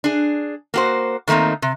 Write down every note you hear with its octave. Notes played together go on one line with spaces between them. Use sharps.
D4 G#4
A#3 F#4 C5
D#3 A3 A#3 C4 D#4
C3